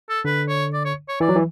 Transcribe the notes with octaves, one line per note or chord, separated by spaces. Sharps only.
A4
D3 B4
C#5
D5
C#5
C#5
E3 D5
F#3
E3